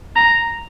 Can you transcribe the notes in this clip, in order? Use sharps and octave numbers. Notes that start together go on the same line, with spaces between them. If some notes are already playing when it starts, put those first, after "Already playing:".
A#5